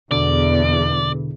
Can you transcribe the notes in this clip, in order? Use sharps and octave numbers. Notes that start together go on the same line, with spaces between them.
E2 B2 D3 D5